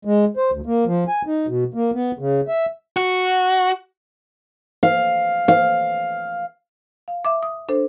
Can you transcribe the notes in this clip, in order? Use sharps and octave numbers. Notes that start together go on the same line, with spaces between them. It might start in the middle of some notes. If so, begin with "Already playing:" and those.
G#3
C5
D2
A#3
F3
G#5
D#4
B2
A#3
B3
C#3
E5
F#4
F5
F5
F5
E5 D6
D#6
D4 A4 C5